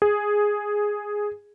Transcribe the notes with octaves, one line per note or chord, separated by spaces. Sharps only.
G#4